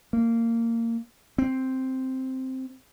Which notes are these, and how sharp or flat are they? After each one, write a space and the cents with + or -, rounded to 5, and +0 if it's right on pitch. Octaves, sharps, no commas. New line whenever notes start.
A#3 -20
C4 +0